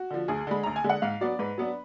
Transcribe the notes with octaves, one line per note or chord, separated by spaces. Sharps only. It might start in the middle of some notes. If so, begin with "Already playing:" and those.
Already playing: F#4
D3 F3
D2 G#4
D3 G#3 B5
D2 A#5
G#5
D3 G#3
F#5
G#2 F5
F#3 B3 D4 D5
G#2 B4
F#3 B3 D4